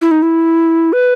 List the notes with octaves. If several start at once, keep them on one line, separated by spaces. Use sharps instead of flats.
E4
D#4
E4
B4